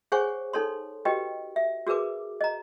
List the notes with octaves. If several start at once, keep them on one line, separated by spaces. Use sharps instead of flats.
G#4 C5 C#5 F#5 G#5 C#6
D#4 A4 C#5 C6
F#4 G4 B4 D#5 G5
E5
F#4 G#4 A#4 B4 D6
D#5 A#5